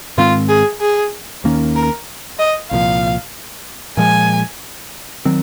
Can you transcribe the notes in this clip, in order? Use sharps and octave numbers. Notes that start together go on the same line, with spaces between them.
G#2 D#3 G#3 C4 F4
G#4
G#4
D#2 D#3 A#3 C#4
A#4
D#5
C2 A#2 F3 F5
A#2 F3 G#3 G#5
D#3 F#3 C4